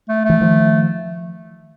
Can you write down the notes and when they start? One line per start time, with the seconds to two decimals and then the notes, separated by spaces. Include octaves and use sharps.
0.09 A3
0.25 E3 A3
0.41 D#3 F3